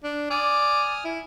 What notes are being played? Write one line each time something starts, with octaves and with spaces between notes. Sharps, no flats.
D4
D5 G#5 D#6 F6
E4